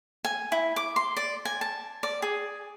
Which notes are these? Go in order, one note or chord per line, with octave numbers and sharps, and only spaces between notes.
G#5
E4
D6
C6
D5
G#5
A5
D5
G#4